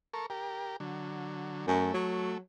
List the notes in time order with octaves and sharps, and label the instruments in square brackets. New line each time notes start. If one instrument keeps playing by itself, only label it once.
[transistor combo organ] A4 A#4 C#6
G4 A#4
D3 F#3
[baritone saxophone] F#2 [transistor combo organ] A3
[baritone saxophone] F#3